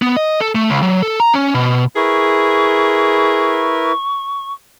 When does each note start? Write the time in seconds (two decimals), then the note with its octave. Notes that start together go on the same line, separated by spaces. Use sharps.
0.02 B3
0.16 D#5
0.40 A4
0.55 A3
0.70 C#2
0.82 F#3
1.02 A4
1.20 A#5
1.33 C#4
1.54 B2
1.96 E4 G#4 A#4 B4 C#6